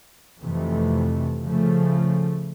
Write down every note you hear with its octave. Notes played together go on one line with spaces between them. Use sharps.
F2 C3 E3 A3
C#3 F3 A3